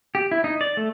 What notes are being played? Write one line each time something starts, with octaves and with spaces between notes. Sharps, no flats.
G4
E4
D#4
D5
A3